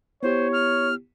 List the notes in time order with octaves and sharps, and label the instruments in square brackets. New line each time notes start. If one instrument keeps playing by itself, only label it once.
[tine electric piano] B3 E4 G4 [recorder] C5 [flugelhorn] C#5
[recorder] F6